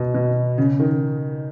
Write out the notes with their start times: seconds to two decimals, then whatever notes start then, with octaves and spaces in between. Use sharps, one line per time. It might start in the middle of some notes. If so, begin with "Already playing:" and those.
Already playing: B2
0.14 B2
0.58 C#3
0.79 D#3